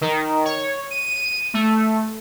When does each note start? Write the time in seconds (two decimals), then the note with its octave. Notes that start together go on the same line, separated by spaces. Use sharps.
0.01 D#3
0.45 C#5
0.91 D#7
1.54 A3